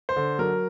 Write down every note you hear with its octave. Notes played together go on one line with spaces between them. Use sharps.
C5
D3
F#3 A#4